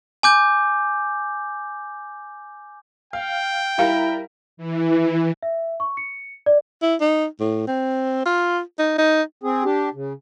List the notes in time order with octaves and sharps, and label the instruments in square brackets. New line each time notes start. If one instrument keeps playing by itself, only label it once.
[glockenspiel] G#5 D6 G6
[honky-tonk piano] F5 [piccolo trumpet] G5
[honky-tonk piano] G3 A#4 [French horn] E4 [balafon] F5
[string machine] E3
[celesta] E5
C#6
C#7
D5
[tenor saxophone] E4
D#4
A2
C4
F4
D#4
D#4
[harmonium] C4 G#4
D4 G4
C#3